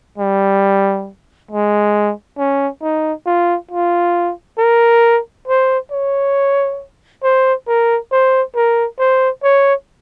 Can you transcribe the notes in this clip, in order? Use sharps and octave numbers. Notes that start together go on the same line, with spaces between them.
G3
G#3
C#4
D#4
F4
F4
A#4
C5
C#5
C5
A#4
C5
A#4
C5
C#5